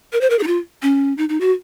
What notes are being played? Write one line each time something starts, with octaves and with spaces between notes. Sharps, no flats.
A#4
C5
A#4
G#4
D#4
F4
C#4
D#4
D#4
F#4